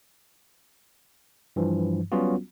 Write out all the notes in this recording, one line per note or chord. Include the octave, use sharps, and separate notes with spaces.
G2 E3 F3
F#3 G3 B3 C#4 F4 F#4